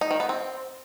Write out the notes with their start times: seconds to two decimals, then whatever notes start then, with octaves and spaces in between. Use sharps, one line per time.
0.01 D#4
0.11 D#3
0.20 B3
0.29 C4